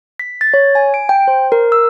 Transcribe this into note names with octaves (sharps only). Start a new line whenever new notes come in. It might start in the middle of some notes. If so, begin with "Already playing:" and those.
B6
A6
C#5
G#5
D7
G5
C5
A#4
E6